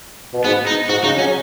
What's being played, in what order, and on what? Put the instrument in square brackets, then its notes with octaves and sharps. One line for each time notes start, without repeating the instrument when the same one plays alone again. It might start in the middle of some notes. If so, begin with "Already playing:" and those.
[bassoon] B2
[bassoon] G#2 [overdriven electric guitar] B3
[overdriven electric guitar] D#4
[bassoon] G#2 [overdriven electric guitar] F#4
[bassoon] C#3 [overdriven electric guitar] D#4
[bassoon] F#3 [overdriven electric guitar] C#4